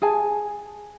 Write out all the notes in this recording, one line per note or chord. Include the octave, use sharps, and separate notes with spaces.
G#4 G#5 A5